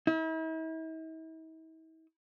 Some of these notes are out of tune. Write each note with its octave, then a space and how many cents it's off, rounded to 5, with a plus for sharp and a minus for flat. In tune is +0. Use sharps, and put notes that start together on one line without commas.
E4 -45